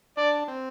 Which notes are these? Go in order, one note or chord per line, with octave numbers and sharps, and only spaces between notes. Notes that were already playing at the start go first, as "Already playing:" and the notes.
D4 D5
C4